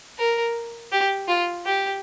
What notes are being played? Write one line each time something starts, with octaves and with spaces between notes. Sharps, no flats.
A#4
G4
F4
G4